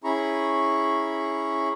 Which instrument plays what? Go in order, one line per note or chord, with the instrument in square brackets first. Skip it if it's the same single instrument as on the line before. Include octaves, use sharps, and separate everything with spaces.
[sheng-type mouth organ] C#4 E4 G#4 A#5 B5 C#6